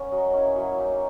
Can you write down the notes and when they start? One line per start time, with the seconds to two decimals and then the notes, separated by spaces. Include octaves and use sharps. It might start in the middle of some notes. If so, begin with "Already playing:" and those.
Already playing: A#3 C#4 F#5
0.12 F#3 D#5
0.33 C#4 E4
0.56 F#3 E5
0.78 A#3 D#4